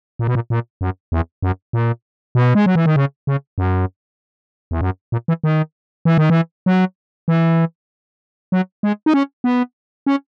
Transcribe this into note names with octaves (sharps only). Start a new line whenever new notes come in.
A#2
B2
A#2
A#2
F#2
E2
F#2
A#2
B2
G#3
F#3
E3
D#3
C#3
C#3
F#2
E2
F#2
A#2
E3
D#3
E3
D#3
E3
F#3
E3
F#3
G#3
D#4
C#4
B3
C#4